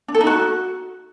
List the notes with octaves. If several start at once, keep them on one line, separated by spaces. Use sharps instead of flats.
D4
A4
D#4
F#4